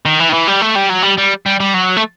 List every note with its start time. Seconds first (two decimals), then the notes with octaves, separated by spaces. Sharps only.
0.06 D#3
0.20 E3
0.29 D#3
0.34 E3
0.48 G3
0.62 A3
0.76 G3
0.90 F#3
1.04 G3
1.18 G3
1.46 G3
1.60 G3
1.74 F#3
1.97 A3